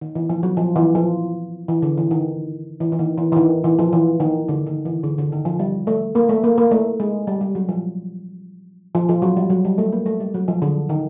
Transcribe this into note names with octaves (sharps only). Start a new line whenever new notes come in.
D#3
E3
F3
F#3
F3
E3
F3
E3
D3
E3
D#3
E3
E3
D#3
E3
E3
D#3
E3
F3
E3
D#3
D3
D#3
E3
D3
D3
D#3
F3
G3
A3
A#3
A3
A#3
A#3
A3
G#3
G3
G3
F#3
F3
F3
F3
F#3
G3
F#3
G3
A3
A#3
A3
G3
F#3
F3
D3
D#3